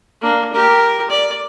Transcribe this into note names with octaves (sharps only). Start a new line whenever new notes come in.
A#3 D4
G4 A#4
D5